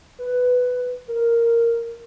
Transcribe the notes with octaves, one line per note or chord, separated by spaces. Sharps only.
B4
A#4